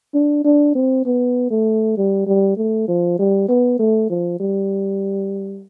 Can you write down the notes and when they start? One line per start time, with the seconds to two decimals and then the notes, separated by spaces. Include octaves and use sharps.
0.14 D4
0.45 D4
0.75 C4
1.05 B3
1.51 A3
1.97 G3
2.27 G3
2.57 A3
2.88 F3
3.19 G3
3.48 B3
3.79 A3
4.10 F3
4.40 G3